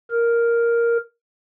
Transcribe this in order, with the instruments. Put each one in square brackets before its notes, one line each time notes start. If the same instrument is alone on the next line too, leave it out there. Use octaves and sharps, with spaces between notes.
[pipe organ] A#4